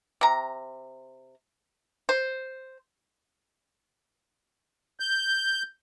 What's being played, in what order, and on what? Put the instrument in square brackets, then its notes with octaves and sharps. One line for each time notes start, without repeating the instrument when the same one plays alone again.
[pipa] C3 A#5
C5
[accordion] G6